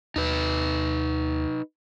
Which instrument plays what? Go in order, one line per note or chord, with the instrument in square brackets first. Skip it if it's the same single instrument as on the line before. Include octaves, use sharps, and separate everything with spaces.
[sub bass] D#2 [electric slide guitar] D#4 B4